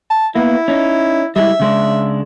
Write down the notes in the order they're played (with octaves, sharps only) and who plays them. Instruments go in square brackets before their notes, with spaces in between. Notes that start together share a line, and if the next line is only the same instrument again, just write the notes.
[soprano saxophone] A5
[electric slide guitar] A#3 B3 [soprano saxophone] E4
[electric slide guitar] C#4 D#4
[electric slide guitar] G3 G#3 E4 [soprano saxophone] E5
[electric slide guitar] C#3 G#3 D4